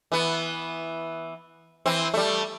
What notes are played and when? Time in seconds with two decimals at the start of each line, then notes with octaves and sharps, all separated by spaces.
0.12 E3 B3
1.86 E3 C4
2.14 G3 A3